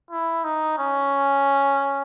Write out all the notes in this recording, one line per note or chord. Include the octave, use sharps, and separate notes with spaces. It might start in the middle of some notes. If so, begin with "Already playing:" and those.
E4
D#4
C#4